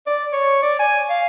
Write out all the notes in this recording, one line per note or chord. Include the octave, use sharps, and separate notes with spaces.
D5
C#5
D5
G#5
F5